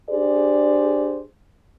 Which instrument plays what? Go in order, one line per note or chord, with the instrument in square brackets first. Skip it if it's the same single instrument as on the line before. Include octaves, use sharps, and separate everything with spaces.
[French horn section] D4 G4 G#4 C5 D5